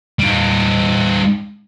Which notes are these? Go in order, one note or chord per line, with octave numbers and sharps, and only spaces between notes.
G3 D#4